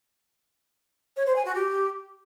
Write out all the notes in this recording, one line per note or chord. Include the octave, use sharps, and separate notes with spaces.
C#5
C5
G#5
F#4
G4